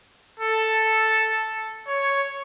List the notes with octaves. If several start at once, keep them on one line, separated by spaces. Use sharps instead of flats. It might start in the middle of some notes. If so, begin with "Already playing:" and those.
A4
C#5